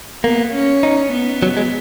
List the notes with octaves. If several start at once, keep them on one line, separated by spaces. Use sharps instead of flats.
A#3 B3
C#4
D#4
B3
F#3
G#3